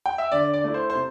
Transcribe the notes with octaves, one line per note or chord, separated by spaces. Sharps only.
G5
E5
D3 D5
D5
A3 E4
C5
C5
C3